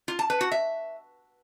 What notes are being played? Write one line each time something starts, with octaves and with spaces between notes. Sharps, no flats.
F4
A5
B4
F#4
E5